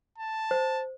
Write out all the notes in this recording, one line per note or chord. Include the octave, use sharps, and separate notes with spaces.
A5
C5